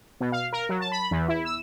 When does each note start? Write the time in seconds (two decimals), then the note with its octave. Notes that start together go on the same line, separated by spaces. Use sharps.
0.20 B2
0.32 F5
0.53 A#4
0.69 F#3
0.80 A5
0.92 B5
1.11 E2
1.28 E4
1.45 E6